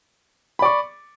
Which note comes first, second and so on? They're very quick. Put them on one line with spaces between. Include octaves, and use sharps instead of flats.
B5 D5 C#6